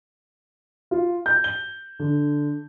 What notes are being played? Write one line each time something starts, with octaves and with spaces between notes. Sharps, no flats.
F4
G6
G7
D3